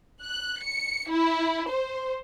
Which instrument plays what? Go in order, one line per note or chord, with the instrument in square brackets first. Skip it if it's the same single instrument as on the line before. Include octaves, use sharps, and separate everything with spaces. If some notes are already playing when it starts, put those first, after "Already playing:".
[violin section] F#6
C#7
E4
C5